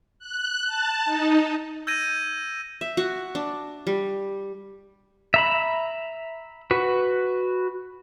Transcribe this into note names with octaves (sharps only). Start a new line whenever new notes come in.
F#6
A5
D#4
E6 G6 G#6 A#6 D#7
E5
F#4
D4
G3
E5 A#5 B5
F#4 B4